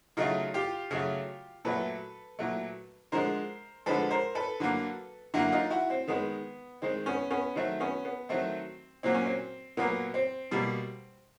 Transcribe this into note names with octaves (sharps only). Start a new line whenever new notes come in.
C#3 F#3 A3 D#4 F4
F4 G4
C#3 F#3 A3
A#2 F#3 A3 A4 B4
A#2 F#3 A3
D3 F3 G#3 A#4 C5
D3 F3 G#3 A4 B4
A#4 C5
A4 B4
D3 F#3 A#3
D3 F#3 A#3 E4 F#4
D#4 F4
E4 F#4
C4
D#3 G#3 B3
D#3 G#3 C4
B3 C#4
B3 C#4
D#3 F#3 A3 C4
B3 C#4
B3
D#3 F#3 A3 C4
A#2 F#3 A#3 C4
C#4
C4
A#2 F#3 A#3 B3
C4
B2 G3 A#3